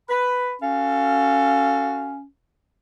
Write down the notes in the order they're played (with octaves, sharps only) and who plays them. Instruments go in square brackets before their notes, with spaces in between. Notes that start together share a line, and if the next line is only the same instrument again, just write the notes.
[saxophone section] B4 [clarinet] B5
[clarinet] C#4 [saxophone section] F#4 A4 F5